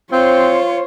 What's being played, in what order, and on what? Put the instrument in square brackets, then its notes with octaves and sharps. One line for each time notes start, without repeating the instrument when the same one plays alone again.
[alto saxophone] C4 [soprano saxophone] F4 [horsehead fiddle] C5 C#5